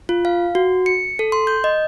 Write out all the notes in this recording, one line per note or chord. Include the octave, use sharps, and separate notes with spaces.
F4
F5
F#4
C#7
A4
C6
G6
D#5